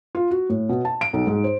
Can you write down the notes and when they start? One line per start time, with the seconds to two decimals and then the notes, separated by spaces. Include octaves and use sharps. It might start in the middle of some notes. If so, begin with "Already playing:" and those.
0.15 F4
0.31 F#4
0.49 A2
0.69 B2
0.85 A5
1.01 D7
1.13 B1
1.27 G#2
1.44 C5